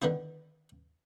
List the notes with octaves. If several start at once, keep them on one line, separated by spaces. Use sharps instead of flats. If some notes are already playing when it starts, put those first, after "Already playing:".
D3 D#3 B3 D#4 E4